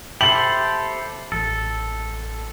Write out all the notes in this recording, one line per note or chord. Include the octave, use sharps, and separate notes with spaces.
G4 A4 C5 E5 A5 B5 F#7
A1 A4